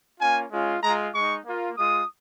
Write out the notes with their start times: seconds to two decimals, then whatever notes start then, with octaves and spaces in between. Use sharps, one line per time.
0.20 A#3 C#4 F4 G#5
0.51 G#3 C#4 F4
0.82 G#3 F4 A#5
1.14 G#3 D#4 C#6
1.46 A#3 F4
1.77 G#3 F4 D#6